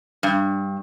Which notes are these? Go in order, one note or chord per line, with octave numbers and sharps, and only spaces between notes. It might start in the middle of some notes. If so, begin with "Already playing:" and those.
G2